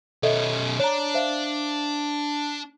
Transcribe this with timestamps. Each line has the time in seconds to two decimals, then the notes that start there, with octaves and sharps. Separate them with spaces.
0.23 B2 C#4 A4 D#5 E5
0.80 D4 C#5 A#5
1.14 C5 E5 F5